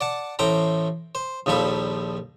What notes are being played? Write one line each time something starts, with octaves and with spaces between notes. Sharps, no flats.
D5 F#5 A5
A1 A2 C5 G5 A#5
C5
A#1 D#2 F3 G3 A4 B5